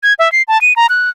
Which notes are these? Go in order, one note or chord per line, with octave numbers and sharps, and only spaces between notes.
G#6
E5
C7
A5
D#7
A#5
F#6